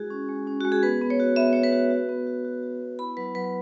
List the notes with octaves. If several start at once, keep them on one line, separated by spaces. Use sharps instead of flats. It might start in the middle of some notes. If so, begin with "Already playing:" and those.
Already playing: G#3 E4 F#4 G#4
C#4
G#3
C#4
G#3 F#4
G#4
B3 B4
B3
C#5
F#4
B3 E5
F#4 C#5
B4
F#4
F#4
B3
F#4
F#4
F#4
B3
E4 B5
F#3 B4
F#3 B4